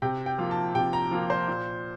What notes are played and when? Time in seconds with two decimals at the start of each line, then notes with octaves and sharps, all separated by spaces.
0.02 C3 G5
0.26 G5
0.38 F3 A#3 F4
0.51 A5
0.75 C3 G5
0.93 A#5
1.11 F3 A#3 F4
1.30 C5
1.48 A#2